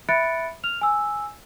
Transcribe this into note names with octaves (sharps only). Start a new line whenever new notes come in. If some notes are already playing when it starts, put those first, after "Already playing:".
E5 B5 F#6 A6 C#7 D7
F6 F7
G#5 E6